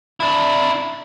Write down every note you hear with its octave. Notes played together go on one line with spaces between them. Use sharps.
D4 E4